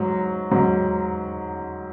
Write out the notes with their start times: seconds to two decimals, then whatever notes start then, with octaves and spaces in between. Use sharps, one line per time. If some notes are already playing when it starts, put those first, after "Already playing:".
Already playing: G#2 F#3
0.51 G#2 F#3